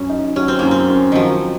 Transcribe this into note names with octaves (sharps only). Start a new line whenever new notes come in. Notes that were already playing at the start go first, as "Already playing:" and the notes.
Already playing: F#2 C#4
D#4
F#3 C#4
C4
F#2 A#3
C4
C#4
D#3 F3 F#3